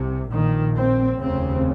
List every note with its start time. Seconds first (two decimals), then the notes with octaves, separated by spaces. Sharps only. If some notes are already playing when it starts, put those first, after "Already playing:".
Already playing: C2 C3
0.30 A#1 A#2 D#3
0.76 C4
1.20 F1 D#2 C#3 C4